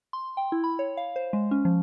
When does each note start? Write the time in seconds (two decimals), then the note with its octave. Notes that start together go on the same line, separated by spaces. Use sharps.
0.13 C6
0.37 G5
0.52 E4
0.64 B5
0.79 C#5
0.97 F5
1.16 C5
1.33 G#3
1.51 C#4
1.65 F3